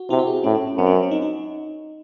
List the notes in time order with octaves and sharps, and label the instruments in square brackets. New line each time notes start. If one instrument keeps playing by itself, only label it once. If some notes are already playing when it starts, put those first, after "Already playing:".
Already playing: [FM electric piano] F#4
[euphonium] C3 [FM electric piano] E4
[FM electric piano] F#4
G#4
E4
[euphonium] A2 [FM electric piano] C#4
[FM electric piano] C#4
C#4
[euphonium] F#2 [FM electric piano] C4
[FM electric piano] C#4
C4
C#4
D#4
D#4